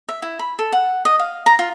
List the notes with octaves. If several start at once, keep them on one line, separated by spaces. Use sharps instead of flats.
E5
E4
B5
A4
F#5
D#5
F5
A#5
F4